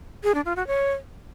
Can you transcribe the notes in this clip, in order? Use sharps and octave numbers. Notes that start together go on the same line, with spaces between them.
G#4
D4
F4
F#4
C#5